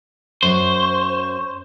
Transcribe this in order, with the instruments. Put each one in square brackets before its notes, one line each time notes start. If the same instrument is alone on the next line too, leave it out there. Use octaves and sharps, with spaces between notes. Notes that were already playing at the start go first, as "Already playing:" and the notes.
[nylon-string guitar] F#2 [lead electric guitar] C5 [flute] C#6